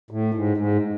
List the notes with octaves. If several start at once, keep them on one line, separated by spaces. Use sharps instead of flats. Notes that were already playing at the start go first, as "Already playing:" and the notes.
A2
G#2
G#2